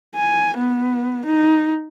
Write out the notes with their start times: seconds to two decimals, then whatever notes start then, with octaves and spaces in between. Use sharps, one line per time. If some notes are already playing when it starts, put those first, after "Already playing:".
0.15 G#5
0.57 B3
1.25 D#4